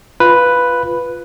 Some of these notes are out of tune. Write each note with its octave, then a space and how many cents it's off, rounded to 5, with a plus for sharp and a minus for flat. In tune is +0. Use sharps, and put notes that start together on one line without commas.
F4 +0 B4 +0